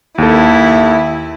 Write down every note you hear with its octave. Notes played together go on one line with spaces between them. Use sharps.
D#2 E4 A4